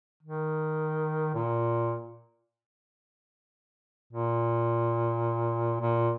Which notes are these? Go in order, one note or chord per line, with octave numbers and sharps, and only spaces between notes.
D#3
A#2
A#2
A#2